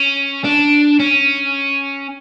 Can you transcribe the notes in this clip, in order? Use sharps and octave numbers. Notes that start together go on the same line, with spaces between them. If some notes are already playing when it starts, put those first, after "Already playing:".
Already playing: C#4
D4
C#4